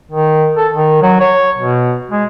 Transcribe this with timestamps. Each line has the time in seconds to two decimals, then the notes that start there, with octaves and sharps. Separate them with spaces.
0.11 D#3
0.57 A4
0.73 D#3
1.02 F#3
1.20 C#5
1.57 B2
2.11 G#3